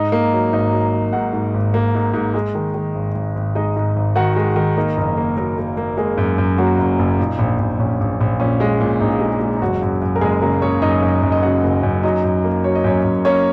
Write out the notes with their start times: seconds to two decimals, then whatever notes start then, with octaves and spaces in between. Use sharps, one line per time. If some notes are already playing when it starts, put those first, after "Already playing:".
Already playing: G#2 D#4 D#5
0.12 A#3
0.32 F#3
0.53 G#1 D#4 D#5
0.72 F#3
0.93 F#3
1.13 G#2 F#4 F#5
1.33 G#2
1.54 G#1
1.74 A#3
1.95 G#2
2.14 G#2
2.34 G#3
2.55 D#3
2.74 D#3
2.95 G#1
3.15 G#1
3.35 G#1
3.55 G#3 D#4 D#5
3.76 G#2
3.96 G#1
4.16 D#3 F#4 F#5
4.36 G#3
4.56 D#3
4.77 A#3 D#4 D#5
4.97 F#1
5.17 A#3
5.37 F#3 A#3 A#4
5.58 A#3
5.77 A#3
5.97 G#3 A#3 G#4
6.17 F#2
6.38 F#2
6.58 F#3 A#3 F#4
6.78 F#1
6.99 F#1
7.19 A#2 D#4
7.39 A#1
7.59 A#1
7.79 A#1 C#4
8.00 A#1
8.21 A#1
8.40 A#2 C#4
8.60 G#3
8.81 A#2
9.01 A#1 D#4
9.21 G#3
9.41 G#3
9.57 D#4
9.62 F#1 F#3 F#4
9.82 F#2
10.02 F#2
10.16 A#4
10.21 F#1 G#3 G#4
10.42 C#3 A#3 A#4
10.62 C#3 C#4 C#5
10.82 F#2 D#4 D#5
11.02 F#2
11.23 F#2
11.32 D#5
11.43 C#3 F#4 F#5
11.64 F#1
11.83 F#2
12.03 F#3 D#4 D#5
12.24 F#2
12.44 A#3
12.64 F#3 C#5
12.75 D#5
12.84 F#2 C#4 C#5
13.04 F#2
13.25 A#3 C#4 C#5